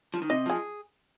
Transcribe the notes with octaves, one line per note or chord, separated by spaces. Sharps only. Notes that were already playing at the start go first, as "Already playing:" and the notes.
F3
D#3
C3 D#5
F3 G#4